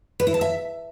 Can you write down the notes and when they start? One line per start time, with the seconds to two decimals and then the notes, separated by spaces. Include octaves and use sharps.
0.20 B4
0.27 E4
0.34 A5
0.41 E5